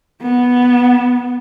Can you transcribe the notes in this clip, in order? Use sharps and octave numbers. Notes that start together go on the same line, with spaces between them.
B3